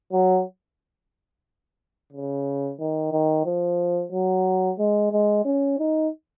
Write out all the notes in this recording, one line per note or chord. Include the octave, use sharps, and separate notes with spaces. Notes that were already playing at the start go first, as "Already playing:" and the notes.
F#3
C#3
D#3
D#3
F3
F#3
G#3
G#3
C#4
D#4